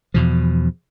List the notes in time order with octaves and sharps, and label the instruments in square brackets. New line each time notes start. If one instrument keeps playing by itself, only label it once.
[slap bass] E2 B2 F3